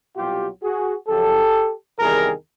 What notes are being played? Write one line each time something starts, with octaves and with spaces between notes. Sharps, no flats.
C2 B2 F#3 F4 G4
F#4 G#4
F#2 C#3 F3 G4 A4
E2 C3 D#3 G3 G#4 A#4